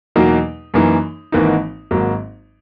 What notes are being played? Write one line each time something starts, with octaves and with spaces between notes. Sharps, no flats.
E2 B2 F#3 A#3 D#4
F#2 E3 A#3 D#4
G#1 G#2 E3 A#3 D#4
G#1 G#2 F#3 A#3